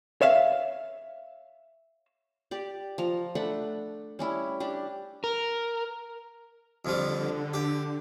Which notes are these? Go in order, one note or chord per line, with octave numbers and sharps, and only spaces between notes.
C#5 E5 F5
G4 D5
F3 A#5
A3 D4 F#5 B5
G3 C#4 E4
D4 G4
A#4
F2 D3 F3 G3
G4